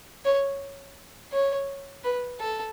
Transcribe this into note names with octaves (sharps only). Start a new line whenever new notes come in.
C#5
C#5
B4
A4